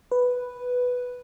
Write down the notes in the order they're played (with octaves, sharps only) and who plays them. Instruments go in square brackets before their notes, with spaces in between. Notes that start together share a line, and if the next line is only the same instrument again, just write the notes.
[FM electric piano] B4